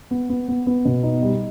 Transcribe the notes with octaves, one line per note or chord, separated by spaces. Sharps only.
B3
B3
B3
B3
B2
D#4
G3